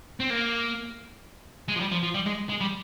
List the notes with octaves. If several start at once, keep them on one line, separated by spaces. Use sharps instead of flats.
C4
A#3
G#3
F3
G3
F3
F3
G3
G#3
G#3
G3